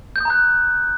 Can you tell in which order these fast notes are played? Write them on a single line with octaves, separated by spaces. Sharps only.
G6 D#6 A#5 F#6